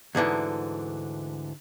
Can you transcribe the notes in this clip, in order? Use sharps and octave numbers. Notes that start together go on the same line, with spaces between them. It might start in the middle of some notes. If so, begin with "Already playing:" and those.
D2 G#2 D3 E3